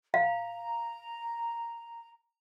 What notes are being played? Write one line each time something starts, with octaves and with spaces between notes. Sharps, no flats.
F5 A#5